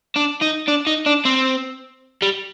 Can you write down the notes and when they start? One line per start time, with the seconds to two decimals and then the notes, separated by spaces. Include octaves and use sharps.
0.16 D4
0.41 D#4
0.68 D4
0.87 D#4
1.06 D4
1.25 C4
2.22 G3